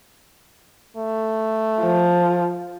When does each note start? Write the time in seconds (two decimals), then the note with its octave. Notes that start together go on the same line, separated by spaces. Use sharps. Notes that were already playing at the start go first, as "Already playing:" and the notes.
0.97 A3
1.81 F3